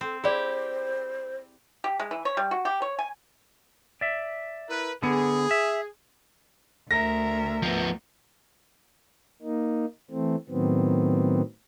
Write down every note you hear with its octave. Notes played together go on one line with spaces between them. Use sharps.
C4 A4
E4 G4 G#4 C5 D5
G4
G#3
E3
C#5
G3
F#4
G4
C#5
G#5
D5 E5
E4 A#4 B4
D3 B3 G#4
E5
D2 A#4 E5 A#6
F3 B3
A#3 D#4
E3 A3 C4
A2 D#3 F#3 B3 C4